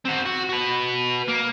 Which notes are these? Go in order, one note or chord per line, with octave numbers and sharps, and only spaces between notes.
C4 F#4
F#4
F#4 B4
A#3